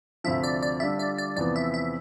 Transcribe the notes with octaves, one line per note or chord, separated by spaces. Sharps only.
D2 C3 F3 E5
D5
D5
D3 G3 D4 F4 E5
D5
D5
E2 C3 F3 B3 D5
E5
E5